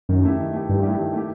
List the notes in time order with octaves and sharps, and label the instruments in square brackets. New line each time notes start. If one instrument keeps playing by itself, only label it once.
[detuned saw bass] F#2 [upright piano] D#3
[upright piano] A3 E4 G4
D#3
A3 E4 G4
[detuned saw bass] G2 [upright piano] D#3
[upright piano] A3 E4 G4
D#3
A3 E4 G4